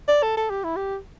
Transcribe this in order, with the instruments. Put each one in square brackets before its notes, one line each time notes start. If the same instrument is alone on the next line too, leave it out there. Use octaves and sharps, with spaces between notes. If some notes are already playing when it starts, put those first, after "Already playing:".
[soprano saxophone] D5
A4
A4
G4
E4
G4